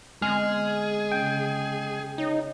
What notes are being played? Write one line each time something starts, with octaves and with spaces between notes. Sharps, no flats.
D3 G#3 B3 C4 G#4 F6
C#3 C#4 G5
D#4 C#5